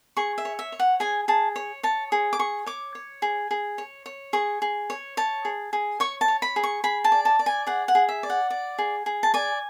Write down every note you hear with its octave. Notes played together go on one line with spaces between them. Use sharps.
G#4 C#6
E5
C#5
E5
C#5
F#5
G#4 G#5
G#4 A5
C#5
C#5 A5
G#4
D6
G#4 C#6
C#5 D6
C#5
G#4
G#4
C#5
C#5
G#4 C#6
G#4
C#5
C#5 A5
G#4
G#4
C#5 C#6
A5
C#5
B5
G#4
C#6
G#4 B5
A5
D5
A5
D5
G#5
G#4 F#5
F#5
G#4
E5
D5
F#5
D5
G#4
G#4
A5
D5 G#5